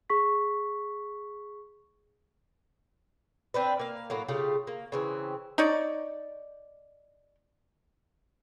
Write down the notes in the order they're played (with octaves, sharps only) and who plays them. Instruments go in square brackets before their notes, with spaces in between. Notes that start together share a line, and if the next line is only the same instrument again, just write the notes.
[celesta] G#4 C#6 B6
[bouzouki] C4 D4 B4
A#3 F5
A2 F#3 A#3
C#3 A3 F4 G4
A#3
C#3 E3 C4
[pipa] D#4 C#5 D5